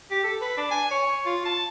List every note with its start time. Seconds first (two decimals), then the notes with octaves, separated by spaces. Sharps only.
0.11 G4
0.24 A4
0.41 B4
0.57 D4
0.71 G#5
0.91 C#5
1.26 F4
1.45 A5